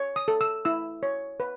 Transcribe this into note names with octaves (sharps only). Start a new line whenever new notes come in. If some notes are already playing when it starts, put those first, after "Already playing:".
Already playing: C#5
D#6
A4
E6
E4 E6
C#5
B4